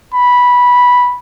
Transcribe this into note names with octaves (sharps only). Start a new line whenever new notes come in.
B5